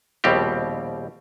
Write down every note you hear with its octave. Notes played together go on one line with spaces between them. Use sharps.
A#1 D#2 B2 G3 C4 G4